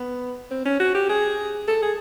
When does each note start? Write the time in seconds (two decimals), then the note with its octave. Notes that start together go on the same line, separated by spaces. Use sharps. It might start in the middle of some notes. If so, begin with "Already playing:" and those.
Already playing: B3
0.51 C4
0.65 C#4
0.80 F#4
0.95 G4
1.09 G#4
1.68 A4
1.82 G#4